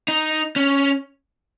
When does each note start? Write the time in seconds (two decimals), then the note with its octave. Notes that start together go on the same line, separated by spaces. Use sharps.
0.08 D#4
0.56 C#4